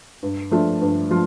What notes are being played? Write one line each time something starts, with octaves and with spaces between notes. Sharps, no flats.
G2
F3 A3 D4 F4
G2
F3 F4